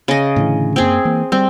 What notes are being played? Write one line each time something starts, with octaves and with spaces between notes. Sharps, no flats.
C#3 D#5
A2 D3 E3
F#2 A#3 C4 G#4
E3 A#3
G3 C4